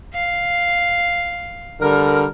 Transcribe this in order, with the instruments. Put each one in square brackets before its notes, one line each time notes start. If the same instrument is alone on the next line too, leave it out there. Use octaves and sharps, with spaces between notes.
[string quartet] F5
[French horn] D3 [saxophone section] G3 A#4